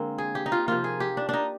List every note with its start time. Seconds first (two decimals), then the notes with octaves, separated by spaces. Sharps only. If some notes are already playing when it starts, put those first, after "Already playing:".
Already playing: D3 G#3 A#3 C4
0.18 G#4
0.35 G4
0.46 D#4
0.52 F4
0.68 C3 F3 A#3 F4
0.84 G#4
1.00 G4
1.17 D4
1.29 D4 D#4